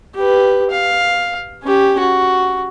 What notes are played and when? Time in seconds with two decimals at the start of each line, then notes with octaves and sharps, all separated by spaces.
0.15 G4 B4
0.70 F5
1.63 C#4 G4
1.99 F#4